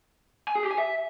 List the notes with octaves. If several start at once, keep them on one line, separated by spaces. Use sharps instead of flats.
G#5
G#4
G4
G#5
E5